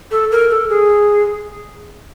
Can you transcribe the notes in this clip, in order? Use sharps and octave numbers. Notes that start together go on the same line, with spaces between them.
A4
A#4
A4
G#4